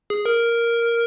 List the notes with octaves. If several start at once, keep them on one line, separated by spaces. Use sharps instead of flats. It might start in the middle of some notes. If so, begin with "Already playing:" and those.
G#4
A#4